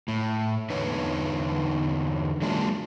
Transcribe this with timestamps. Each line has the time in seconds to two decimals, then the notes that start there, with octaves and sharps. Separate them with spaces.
0.08 A2
0.70 E2 D3 D#4 B4 C#5
2.42 F#3 G#3 A#3 D4 E4 F4